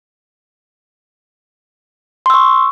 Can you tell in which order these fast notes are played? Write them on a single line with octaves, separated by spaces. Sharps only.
C6 E6 C#6